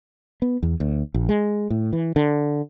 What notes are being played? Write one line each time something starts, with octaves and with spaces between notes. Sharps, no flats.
B3
E2
D2
A#1
G#3
A2
E3
D3